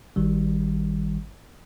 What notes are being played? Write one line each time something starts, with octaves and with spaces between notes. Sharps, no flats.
G#1 D#3 G3